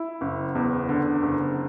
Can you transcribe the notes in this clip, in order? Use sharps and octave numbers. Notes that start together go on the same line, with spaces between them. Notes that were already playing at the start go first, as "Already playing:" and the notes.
Already playing: E4
F#1
E2
D3
F#1